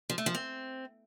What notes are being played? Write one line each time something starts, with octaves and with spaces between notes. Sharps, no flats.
F3
A3
F3
C4